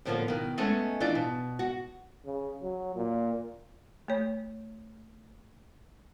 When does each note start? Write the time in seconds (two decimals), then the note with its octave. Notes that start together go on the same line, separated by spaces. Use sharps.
0.05 A2 D3 F3 G#3 A#3 B3
0.28 B2 D#3
0.58 G#3 A3 B3 C#4
1.00 E3 D4 D#4 F4 D5
1.15 B2
1.59 F#4
2.25 C#3
2.62 F#3
2.96 A#2
4.08 A3 C#5